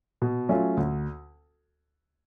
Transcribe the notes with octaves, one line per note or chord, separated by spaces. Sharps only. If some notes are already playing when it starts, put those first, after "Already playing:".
B2
F#3 A3 C#4 F4
D2